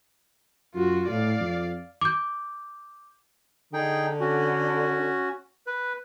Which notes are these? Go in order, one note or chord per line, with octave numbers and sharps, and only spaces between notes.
F#2 F4 F#4
A2 D5 F5
F2
D6 G6
D3 D#4 G#4 G5
C#4 F#4
B4